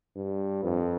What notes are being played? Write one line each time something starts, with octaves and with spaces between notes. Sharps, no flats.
G2
F2